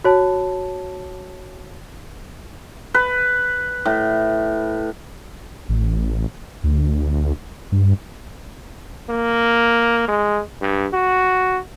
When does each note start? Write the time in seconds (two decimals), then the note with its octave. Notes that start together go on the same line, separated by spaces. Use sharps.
0.04 F#4 C#5 A5
2.94 B4
3.85 A2
5.69 A1
6.64 D2
7.72 G2
9.10 A#3
10.08 G#3
10.61 G2
10.93 F#4